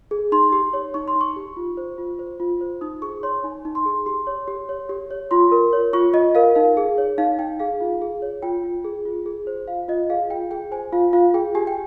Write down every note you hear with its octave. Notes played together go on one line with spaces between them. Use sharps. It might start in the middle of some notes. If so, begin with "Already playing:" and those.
G#4
D#4 C6
G4
C#5
D#4 C#6
C6
D#4
C#6
G4
F4
C5
F4
C5
F4
C5
D#4 D#6
G#4 C#6
C#5 C6
D#4 G#5
D#4
C6
G#4
G4 C6
C#5
G4
C#5
G4
C#5
F4 C6
A#4
C#5
F4 C#6
F4 D#5
A#4 F5
D#4 F5
G#4
C#5
D#4 F5
D#4 G5
G#4 F5
F4
G#4
C#5
F4 G5
F4
G#4
F4
G#4
C5
F4 F5
F4 D#5
G#4 F5
F4 G5
G#4 G5
C5 G#5
F4 F5
F4 F5
G#4 G5
G4 G#5
G5